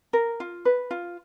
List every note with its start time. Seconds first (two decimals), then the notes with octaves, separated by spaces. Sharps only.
0.13 A#4
0.40 F4
0.65 B4
0.91 F4